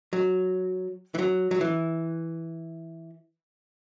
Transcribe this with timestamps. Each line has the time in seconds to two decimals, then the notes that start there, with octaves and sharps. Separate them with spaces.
0.13 F#3
1.15 E3
1.19 F#3
1.51 F#3
1.61 E3